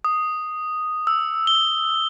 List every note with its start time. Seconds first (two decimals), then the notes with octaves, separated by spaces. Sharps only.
0.05 D#6
1.07 E6
1.47 G7